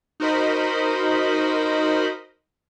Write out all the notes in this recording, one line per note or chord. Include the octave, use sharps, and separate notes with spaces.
D#4 F#4 A#4 C5 D#5 B5